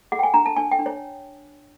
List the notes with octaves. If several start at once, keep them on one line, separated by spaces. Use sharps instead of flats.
G#4 F#5
G5
G#5
D4 A#5
A5
D4 G#5
G5
D4
C#5